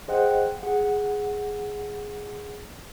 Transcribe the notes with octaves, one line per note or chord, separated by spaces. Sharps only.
G#4 C5 D#5 F#5 G5 F#6
G#4 F#5